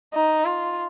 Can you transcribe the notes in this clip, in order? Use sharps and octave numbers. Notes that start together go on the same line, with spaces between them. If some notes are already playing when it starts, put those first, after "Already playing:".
D#4
F4